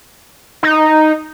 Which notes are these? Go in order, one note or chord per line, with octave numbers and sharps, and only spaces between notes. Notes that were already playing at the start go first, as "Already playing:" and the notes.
D#4